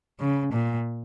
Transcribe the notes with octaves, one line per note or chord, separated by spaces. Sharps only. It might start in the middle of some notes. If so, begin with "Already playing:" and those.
C#3
A#2